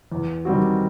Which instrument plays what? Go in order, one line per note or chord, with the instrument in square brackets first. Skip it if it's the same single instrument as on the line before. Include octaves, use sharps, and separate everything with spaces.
[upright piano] E2
D#3 G3 C4 F#4